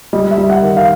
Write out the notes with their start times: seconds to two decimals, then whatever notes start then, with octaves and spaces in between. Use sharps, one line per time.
0.13 G3 D#5
0.31 E5
0.38 G3
0.50 F#5
0.62 D#3
0.77 F5